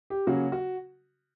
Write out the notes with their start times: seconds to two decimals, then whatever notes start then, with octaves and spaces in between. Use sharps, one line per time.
0.10 G4
0.27 C#3 F#3 A#3 C#4 F#4
0.52 F#4